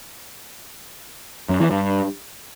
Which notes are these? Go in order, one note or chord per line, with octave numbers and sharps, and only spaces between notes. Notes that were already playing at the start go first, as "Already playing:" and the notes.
F#2
E3
G2